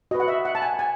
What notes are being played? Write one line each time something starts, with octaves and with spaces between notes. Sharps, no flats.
F#4 B4 D#5
F#5
E5
F#5
A5
G#5
G#5